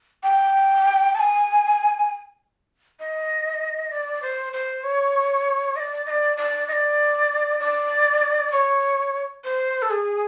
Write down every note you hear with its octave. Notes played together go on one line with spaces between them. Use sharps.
G5
A5
G#5
D#5
D5
C5
C5
C#5
D#5
D5
D#5
D5
D5
D#5
D5
D5
C#5
C5
A4
G#4